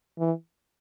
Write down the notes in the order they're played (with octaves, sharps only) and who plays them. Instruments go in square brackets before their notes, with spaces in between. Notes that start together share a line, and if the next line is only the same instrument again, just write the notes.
[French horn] E3